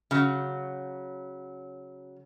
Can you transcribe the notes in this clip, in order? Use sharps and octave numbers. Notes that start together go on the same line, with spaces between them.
C#3 F#3